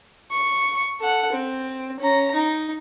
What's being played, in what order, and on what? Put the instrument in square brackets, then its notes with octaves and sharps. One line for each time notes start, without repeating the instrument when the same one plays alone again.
[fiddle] C#6
A4 F#5
C4
C#4 A#5
D#4